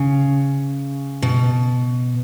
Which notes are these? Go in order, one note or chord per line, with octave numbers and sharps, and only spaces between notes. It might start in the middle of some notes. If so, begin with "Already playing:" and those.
Already playing: C#3
B2